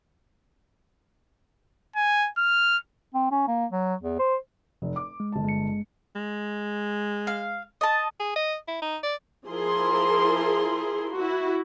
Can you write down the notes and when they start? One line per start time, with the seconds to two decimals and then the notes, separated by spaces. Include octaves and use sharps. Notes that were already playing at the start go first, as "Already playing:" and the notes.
1.96 G#5
2.38 F6
3.14 C4
3.31 C#4
3.48 A#3
3.72 F#3
4.02 E2
4.19 C5
4.82 F1
4.96 D6
5.20 G#3
5.32 G1 A5
5.45 G#3 C#7
6.16 G#3
7.27 F5
7.81 D#5 A5
8.20 G#4
8.36 D#5
8.68 E4
8.82 D#4
9.03 D5
9.47 F3 E4 G#4 A#4 C6
11.14 E4 F#4